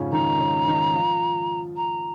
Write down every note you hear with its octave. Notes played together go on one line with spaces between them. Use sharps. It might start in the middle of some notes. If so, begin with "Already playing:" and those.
Already playing: F2 G#2 C#3 F3 G#3 C#4
D#3 D#4 A#5
C#3 C#4
D#3 D#4
F3 F4
A#5